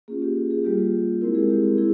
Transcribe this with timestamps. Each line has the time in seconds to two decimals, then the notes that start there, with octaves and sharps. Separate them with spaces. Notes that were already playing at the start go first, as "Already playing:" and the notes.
0.08 A#3 C#4 F4 G#4
0.22 G4
0.36 G4
0.51 G#4
0.64 G3 A#3 F4 G4
1.21 G#3 C4 E4 A#4
1.35 G#4
1.49 G4
1.78 E4 G#4